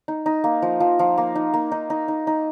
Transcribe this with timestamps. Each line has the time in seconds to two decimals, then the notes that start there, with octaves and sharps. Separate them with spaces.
0.08 D#4
0.26 D#4
0.44 A#3
0.62 F3
0.80 F3
0.99 F3
1.17 A#3
1.35 D#4
1.54 A#3
1.72 D#4
1.90 D#4
2.08 D#4
2.27 D#4